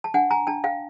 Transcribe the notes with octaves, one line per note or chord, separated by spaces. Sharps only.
A5
D4 F#5 G#5
G#5 A#5
D4 G5 A5
F5 G5